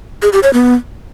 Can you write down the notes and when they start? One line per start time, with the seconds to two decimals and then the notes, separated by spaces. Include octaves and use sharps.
0.22 G#4
0.33 G4
0.43 C#5
0.53 B3